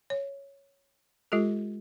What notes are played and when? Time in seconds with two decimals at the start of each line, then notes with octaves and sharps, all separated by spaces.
0.10 C#5
1.32 G#3 F4 G4 A4